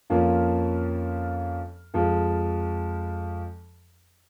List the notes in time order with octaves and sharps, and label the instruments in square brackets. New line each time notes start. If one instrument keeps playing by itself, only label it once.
[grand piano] F2 F3 A#3 C#4 F4
F2 F3 G#3